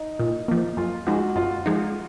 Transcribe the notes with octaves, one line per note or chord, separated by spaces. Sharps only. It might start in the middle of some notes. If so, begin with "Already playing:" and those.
Already playing: D#4
A#2
F3 A#3
F#2 F4
F3 G#3 D#4 F#4
F#2 F4
F3 G#3 D#4